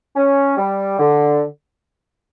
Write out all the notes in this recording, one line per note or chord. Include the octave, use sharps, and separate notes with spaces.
C#4
G3
D3